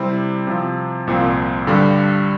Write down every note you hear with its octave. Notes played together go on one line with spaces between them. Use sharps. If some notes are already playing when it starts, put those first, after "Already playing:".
Already playing: C3 G3 C4 E4
C3 F3 C4
C2 A#2 F3 C4
G2 D3 G3